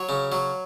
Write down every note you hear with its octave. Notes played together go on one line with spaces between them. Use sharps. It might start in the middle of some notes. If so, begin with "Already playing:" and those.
Already playing: F#3 C#5
C#3
F#3